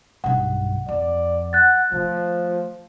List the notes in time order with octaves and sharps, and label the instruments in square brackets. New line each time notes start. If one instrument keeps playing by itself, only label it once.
[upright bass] B1 G2 [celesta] F#5
[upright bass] F2 [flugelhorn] D5
[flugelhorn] F#5 [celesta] F#6 A6
[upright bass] D#3 A3 [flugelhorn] F3